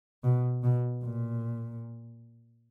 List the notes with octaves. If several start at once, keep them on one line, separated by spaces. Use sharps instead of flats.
B2
B2
A#2